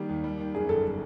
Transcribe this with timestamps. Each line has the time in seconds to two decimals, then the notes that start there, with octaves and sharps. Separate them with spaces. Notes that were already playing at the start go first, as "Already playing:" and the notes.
Already playing: D#3 G3 A#3 G4
0.09 D#2
0.24 G3
0.39 D#3
0.54 F#2 G#4
0.69 G1 A4